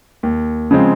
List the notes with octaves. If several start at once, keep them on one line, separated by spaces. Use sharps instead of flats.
D#2
C#3 F3 G#3 C4